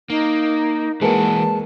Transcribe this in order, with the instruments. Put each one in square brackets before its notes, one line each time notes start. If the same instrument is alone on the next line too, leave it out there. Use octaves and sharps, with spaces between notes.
[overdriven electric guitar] A#3 [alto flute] D#4
[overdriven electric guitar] E3 F#4 [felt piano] G#3 A#3 B4 [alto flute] A5